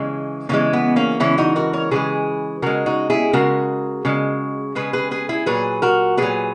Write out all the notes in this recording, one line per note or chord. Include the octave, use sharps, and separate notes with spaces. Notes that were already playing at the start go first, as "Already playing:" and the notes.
Already playing: C#3 E3 G#3
C#3 E3 G#3 A#3
B3
A#3 C#4
C#3 E3 G#3 C#4 E4
D#4 F#4
F#4 A#4
A#4 C#5
C#3 E3 G#3 G#4 B4
C#3 G#3 F#4 A#4
D#4 F#4
E4 G#4
C#3 G#3 F#4 A#4
C#3 G#3
C#3 G#3 G#4 B4
G#4 B4
G#4 B4
E4 G#4
A#2 F#3 G#4 B4
F#4 A#4
A#2 F#3 G#4 B4